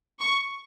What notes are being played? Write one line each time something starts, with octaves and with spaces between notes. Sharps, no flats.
C#6